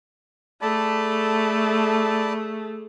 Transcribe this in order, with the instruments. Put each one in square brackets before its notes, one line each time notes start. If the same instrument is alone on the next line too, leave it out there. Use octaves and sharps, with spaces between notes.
[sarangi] A3 [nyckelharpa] G#4 A4 [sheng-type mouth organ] D5 A5 B5